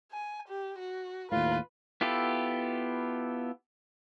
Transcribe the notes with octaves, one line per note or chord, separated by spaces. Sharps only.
G#5
G4
F#4
D#2 A2 F4 B4
B3 E4 F4 G4 A4